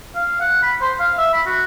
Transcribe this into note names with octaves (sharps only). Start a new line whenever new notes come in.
F5
F#5
B5
C5
F5
E5
B5
F#4